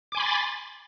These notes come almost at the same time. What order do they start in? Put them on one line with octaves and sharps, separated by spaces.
D6 G#5 C6 B5 A6